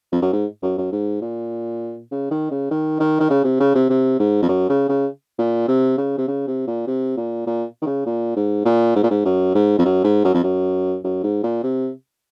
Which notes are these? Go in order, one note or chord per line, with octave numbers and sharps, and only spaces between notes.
F2
F#2
G#2
F#2
F#2
G#2
A#2
C#3
D#3
C#3
D#3
D#3
D#3
C#3
C3
C#3
C3
C3
G#2
F2
F#2
C#3
C#3
A#2
C3
C#3
C3
C#3
C3
A#2
C3
A#2
A#2
D#3
C#3
A#2
G#2
A#2
G#2
A#2
G#2
F#2
G#2
F2
F#2
G#2
F#2
F2
F#2
F#2
G#2
A#2
C3